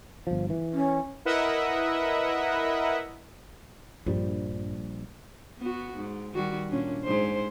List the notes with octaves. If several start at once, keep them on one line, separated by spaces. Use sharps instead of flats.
G1 F3
E3
C#4
E4 A#4 B4 D#5 E5 F#5
A#1 G2 F3 G3
B3 F#4
G#2
D#3 G3 F#4
A#2 C#4 D4
G#2 C5